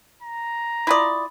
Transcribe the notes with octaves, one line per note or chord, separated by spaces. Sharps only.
A#5
E4 F4 D5 B5 D#6